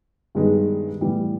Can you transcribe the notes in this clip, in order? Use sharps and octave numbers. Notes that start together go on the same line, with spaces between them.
G2 D#3 G#3 B3
A2 E3 G3 B3